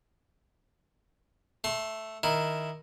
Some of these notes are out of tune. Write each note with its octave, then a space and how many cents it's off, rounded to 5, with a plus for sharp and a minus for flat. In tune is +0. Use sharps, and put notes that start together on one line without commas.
A3 +0 C6 +25
D#3 +0 E4 +0